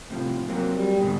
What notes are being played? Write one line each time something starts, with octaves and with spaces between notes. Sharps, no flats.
A2 C3 F3
F#3 A#3 C4
G3
G#2 B2 D3